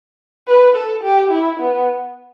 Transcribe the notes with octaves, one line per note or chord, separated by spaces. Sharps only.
B4
A4
G4
E4
B3